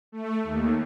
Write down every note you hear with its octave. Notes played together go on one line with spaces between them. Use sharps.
A3
D#2